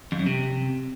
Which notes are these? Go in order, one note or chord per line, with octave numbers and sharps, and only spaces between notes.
F2
F#2
C3